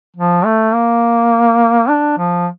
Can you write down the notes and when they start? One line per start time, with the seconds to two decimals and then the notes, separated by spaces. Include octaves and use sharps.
0.16 F3
0.45 A3
0.74 A#3
1.89 D4
2.18 F3